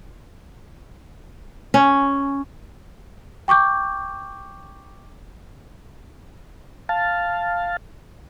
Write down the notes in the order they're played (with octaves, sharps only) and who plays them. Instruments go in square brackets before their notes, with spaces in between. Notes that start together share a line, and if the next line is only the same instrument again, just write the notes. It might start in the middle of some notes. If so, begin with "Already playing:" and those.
[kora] C#4
[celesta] G5 C#6 D6 G6
[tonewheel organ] F5 A5